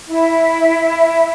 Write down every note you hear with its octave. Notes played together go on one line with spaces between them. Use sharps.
E4